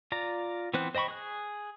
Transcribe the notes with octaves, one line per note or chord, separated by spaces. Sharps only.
F4 D5 A#5
E3 B3 C4 C5 F#6
C5 D#5 G5 B5 C#6
G#4 F#6